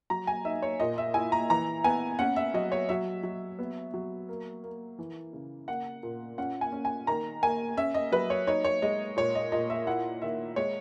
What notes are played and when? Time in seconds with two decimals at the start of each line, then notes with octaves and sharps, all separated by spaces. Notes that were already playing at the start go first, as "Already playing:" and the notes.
0.10 F#3 A#5
0.27 G#5
0.45 D#4 E5
0.62 C#5
0.80 A#2 D#5
0.98 E5
1.14 E4 G#5
1.32 A#5
1.50 E3 A#5
1.84 B3 G#5
2.19 C#4 F#5
2.36 E5
2.54 F#3 D#5
2.72 C#5
2.89 F#3 E5
3.23 F#3
3.59 B3
3.94 F#3
4.29 A#3
4.63 A#3
4.99 E3
5.33 C#3
5.68 A#3 F#5
6.03 A#2
6.38 C#4 F#5
6.61 G#5
6.72 C#4
6.85 G#5
7.07 D#3 A#5
7.43 A#3 G#5
7.77 C#4 E5
7.94 D#5
8.12 F#3 B4
8.30 C#5
8.47 D#4 C#5
8.65 C#5
8.82 G#3 D#5
9.17 A#2 C#5
9.35 D#5
9.52 A#2 D#5
9.70 E5
9.87 E4 F#5
10.22 D#3 E5
10.56 G#3 C#5